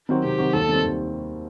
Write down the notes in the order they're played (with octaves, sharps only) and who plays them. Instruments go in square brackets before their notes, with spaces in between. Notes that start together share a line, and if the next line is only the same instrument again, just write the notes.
[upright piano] D#3 F#3 C4 F#4
[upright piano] C3 [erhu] G4
[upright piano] D#3 F#3 C4 F#4
[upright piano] D#2 [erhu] A4
[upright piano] D#3 G3 C4
D#2